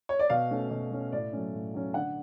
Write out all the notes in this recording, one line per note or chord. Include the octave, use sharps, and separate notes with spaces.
C#5
D5
B2 F5
A3 C#4
B2
A3 C#4
A2 D5
F#3 A3 C#4
A2
F#3 A3 C#4
D3 F#5